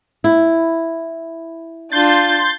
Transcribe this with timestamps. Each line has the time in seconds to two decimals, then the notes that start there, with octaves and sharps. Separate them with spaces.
0.24 E4
1.92 D4 F4 C6 G6 A6